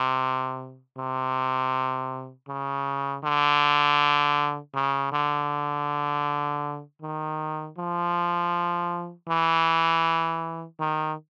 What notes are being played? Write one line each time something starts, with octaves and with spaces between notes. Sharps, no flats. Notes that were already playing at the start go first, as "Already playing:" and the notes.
Already playing: C3
C3
C#3
D3
C#3
D3
D#3
F3
E3
D#3